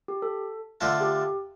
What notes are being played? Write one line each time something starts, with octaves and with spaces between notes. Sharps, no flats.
G4
A4
D3 A3 F4 A4
G4